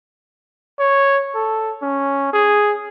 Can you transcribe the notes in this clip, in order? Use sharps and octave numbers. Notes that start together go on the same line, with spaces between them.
C#5
A4
C#4
G#4